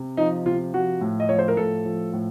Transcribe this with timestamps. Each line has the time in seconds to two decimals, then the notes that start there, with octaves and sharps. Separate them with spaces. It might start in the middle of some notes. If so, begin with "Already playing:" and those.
Already playing: C3
0.17 F3 D#4
0.46 C3 F4
0.74 F3 F#4
1.01 A2
1.20 D#5
1.29 F3 C#5
1.39 C5
1.48 A#4
1.57 A2 A4
1.85 F3
2.13 A2